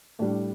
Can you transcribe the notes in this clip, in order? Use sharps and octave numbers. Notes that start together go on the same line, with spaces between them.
A2 G3 D4